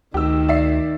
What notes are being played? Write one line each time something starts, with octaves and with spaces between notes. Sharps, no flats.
D2 D#3 G4 E6
D5 E5 C7